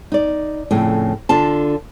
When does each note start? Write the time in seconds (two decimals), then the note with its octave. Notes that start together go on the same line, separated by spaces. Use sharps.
0.12 D#4 D5
0.71 F2 A2 C#3
1.29 D3 D4 F4 A5